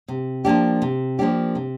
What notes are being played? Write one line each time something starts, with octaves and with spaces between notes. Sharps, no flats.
C3
F3 A#3 D4 G4
C3
F3 A#3 D4 G4
C3